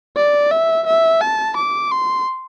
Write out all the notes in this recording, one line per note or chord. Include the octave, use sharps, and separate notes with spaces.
D5
E5
E5
A5
D6
C6